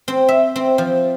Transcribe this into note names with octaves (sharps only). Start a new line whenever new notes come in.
C4
E5
C4
F3